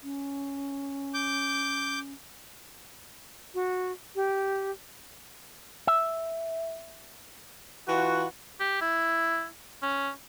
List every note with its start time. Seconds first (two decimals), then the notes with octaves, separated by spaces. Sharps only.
0.03 C#4
1.14 D6 G6
3.54 F#4
4.16 G4
5.87 E5
7.88 E3 F4 F#4
8.60 G4
8.81 E4
9.82 C#4